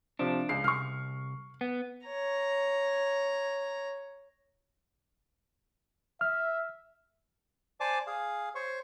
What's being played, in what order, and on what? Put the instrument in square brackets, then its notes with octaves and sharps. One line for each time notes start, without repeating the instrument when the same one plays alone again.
[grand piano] C3 F3 [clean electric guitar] D4
[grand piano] C#2 C7
[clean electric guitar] C2 [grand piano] C#6 F6
[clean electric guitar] B3
[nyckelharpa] C#5 A#5
[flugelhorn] E5 [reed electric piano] F6
[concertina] C5 D5 G#5 A5 D6
G#4 F5
C5 C#5 C#6